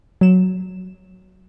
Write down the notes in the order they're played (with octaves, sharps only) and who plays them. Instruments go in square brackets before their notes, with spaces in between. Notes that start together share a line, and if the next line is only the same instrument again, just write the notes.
[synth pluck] F#3 E7